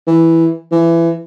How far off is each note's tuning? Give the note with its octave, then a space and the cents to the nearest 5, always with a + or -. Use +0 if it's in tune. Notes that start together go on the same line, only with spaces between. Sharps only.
E3 -5
E3 +20